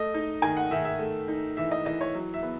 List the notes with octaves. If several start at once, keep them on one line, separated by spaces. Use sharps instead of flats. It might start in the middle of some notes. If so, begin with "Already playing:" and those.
Already playing: A3 D#5
D#4
D#3 G#5
F#5
D#3 E5
E5
A3
D#4
E3 E5
D#5
E3 D#5
C#5
F#3
E5
B3